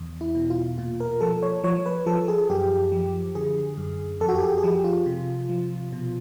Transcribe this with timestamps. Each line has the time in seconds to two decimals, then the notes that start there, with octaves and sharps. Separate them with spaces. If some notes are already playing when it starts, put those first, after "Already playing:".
Already playing: E2
0.21 E4
0.35 B2
0.50 F4
0.78 A#2 F4
1.00 A#4
1.21 F3 A4
1.43 C#5
1.64 F3 C#5
1.86 B4
2.06 F3 A4
2.28 G#4
2.49 F#2 G4
2.92 F3
3.35 D3 G#4
3.77 F#2
4.20 F2 A4
4.28 F#4
4.36 G4
4.42 G#4
4.58 G#4
4.64 F3 G4
4.84 F4
5.06 C3
5.49 F3
5.92 B2